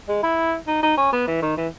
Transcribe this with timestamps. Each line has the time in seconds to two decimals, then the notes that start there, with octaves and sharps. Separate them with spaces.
0.08 G#3
0.23 E4
0.68 D#4
0.83 D#4
0.97 C#4
1.13 B3
1.27 E3
1.42 D#3
1.57 E3